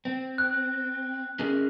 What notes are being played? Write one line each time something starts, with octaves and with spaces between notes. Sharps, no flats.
C4
F#6
C#4 G#4 A#4